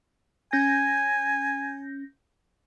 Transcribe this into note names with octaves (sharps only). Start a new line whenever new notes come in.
C#4 G#5 G6 A#6